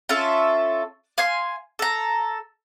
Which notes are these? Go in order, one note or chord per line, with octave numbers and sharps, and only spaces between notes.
C#4 F4 A4 E5
F5 G#5 C6
A4 A#5